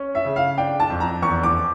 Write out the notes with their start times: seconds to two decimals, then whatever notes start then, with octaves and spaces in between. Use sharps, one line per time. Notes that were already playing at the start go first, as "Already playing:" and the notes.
Already playing: C#4
0.15 E5
0.25 C#3
0.36 F5
0.58 D4 G5
0.80 A5
0.90 F2
1.00 A#5
1.22 E2 C#6
1.43 D6